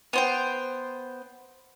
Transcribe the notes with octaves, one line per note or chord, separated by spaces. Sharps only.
B3 C5 G5